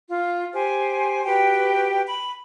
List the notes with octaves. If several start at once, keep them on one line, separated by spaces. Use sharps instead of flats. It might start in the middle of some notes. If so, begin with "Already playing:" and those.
F4 F5
G4 C5 G#5
F#4 G4 B4 G5
B5